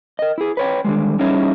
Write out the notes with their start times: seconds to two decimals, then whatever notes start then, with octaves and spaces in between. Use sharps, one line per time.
0.19 A#4 D#5
0.38 E4 G#4
0.57 B4 C#5 G5
0.85 D3 D#3 G3 G#3
1.19 G3 C#4 D#4 E4 G#4 C#5